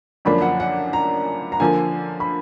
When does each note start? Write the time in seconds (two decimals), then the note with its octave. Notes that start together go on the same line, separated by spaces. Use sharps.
0.25 F#2 D3 F3 A#3 D4 B5
0.42 F#5
0.60 F#5
0.93 A#5
1.52 A#5
1.60 D3 F3 A#3 G#5
2.20 B5